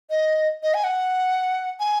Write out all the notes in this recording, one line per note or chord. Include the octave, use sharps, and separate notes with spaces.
D#5
D#5
G#5
F#5
G#5